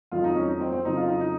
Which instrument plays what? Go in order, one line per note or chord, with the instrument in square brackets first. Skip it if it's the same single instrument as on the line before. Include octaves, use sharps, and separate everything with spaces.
[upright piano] F2 D#3 F#3 F4
D#4
C#4
D#4
C4
C4
F2 C#3 F#3 D#4
F4
D#4
D#4